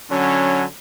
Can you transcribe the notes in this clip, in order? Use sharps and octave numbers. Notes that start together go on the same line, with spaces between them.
D3 F#3 C#4